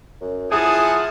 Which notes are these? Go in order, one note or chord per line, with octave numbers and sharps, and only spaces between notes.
F#2
F3 E4 G#4 F#5 G#5 A5 D#6